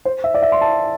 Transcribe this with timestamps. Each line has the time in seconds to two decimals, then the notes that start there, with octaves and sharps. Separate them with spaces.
0.05 C5
0.24 E5
0.34 D5
0.43 E5
0.52 C6
0.61 A5